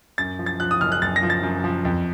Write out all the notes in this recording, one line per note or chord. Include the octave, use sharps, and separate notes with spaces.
F#2 A6
F3
A6
F3 F#6
D#6
F#1 F6
F#6
F#1 A6
A#6
F3
A6
F#2
F3
F2